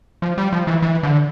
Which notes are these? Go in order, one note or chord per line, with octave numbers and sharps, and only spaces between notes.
F3
G3
F3
E3
E3
D3